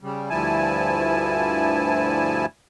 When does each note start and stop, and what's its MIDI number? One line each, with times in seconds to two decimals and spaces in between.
0.01 0.29 49
0.01 0.29 55
0.30 2.46 38
0.30 2.46 43
0.30 2.46 53
0.30 2.46 64
0.30 2.46 80
0.30 2.46 81